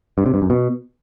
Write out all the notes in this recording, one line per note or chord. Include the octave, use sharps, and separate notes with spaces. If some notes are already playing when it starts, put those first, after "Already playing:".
G2
C3
G2
F#2
B2